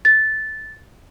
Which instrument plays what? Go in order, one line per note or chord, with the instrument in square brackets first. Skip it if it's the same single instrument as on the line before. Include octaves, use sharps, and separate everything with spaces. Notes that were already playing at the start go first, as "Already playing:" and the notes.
[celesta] A6